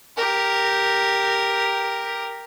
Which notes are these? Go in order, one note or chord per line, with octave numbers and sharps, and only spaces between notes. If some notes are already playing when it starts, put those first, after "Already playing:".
G4 A#4